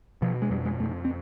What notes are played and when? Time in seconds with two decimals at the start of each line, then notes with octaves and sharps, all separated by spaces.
0.22 B2 F3
0.42 G#3
0.50 F2 G3
0.65 G#3
0.79 F2 A3
1.05 C4